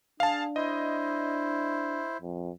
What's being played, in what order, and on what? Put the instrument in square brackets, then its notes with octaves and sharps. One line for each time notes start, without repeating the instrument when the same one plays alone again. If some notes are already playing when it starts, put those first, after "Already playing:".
[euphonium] D4 [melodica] G#4 [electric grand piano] F5 A5
[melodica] E4 C5 [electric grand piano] D#5
[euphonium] F2